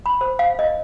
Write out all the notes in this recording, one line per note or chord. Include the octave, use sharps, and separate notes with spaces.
B5
C5
F5
D#5